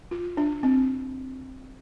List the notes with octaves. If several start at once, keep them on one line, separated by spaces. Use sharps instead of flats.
F4
D4
C4